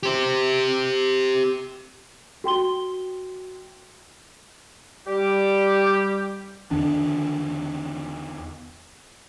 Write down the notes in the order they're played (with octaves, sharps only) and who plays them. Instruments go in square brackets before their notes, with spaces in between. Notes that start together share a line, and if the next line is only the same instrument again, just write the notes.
[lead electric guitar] G4 C5
[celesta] F#4 G5 C6 G7
[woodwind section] G3 G4
[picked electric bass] E2 D3 D#3 D4